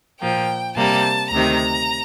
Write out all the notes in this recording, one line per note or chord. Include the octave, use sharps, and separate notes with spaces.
A#2 F3 A#3 G5
C3 G3 A#3 A5
D2 C3 D#3 A#5